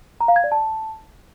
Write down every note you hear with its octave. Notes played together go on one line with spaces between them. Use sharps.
A#5
F5
G#6
D5
A5